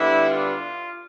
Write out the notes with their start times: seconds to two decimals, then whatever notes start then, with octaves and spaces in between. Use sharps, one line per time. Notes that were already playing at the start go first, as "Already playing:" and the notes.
Already playing: D3 G3 B3 D4 E4
0.28 F4